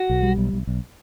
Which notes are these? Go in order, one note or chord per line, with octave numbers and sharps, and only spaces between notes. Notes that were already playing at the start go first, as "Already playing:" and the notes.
Already playing: F#4
B1
G3
B1
B1
B1